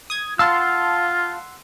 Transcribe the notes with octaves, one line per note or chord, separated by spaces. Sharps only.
D#6 G#6
F4 F5 F#5 A5 C6 E6